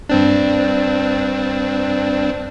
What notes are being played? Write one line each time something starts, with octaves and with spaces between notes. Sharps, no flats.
G2 C4 D4